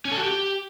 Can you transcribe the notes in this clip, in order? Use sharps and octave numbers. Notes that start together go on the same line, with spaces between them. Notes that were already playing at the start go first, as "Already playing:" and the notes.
C#4
A4
F#4
G4